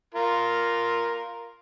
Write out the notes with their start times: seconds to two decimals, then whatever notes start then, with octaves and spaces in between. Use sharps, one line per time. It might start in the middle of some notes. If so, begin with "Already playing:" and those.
0.15 F4 A#4